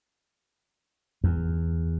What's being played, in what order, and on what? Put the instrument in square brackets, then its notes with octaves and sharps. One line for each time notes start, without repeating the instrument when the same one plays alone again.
[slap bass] E2